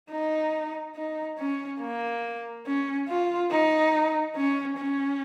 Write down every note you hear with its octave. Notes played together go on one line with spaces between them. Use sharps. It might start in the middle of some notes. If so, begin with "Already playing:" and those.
D#4
D#4
C#4
A#3
C#4
F4
D#4
C#4
C#4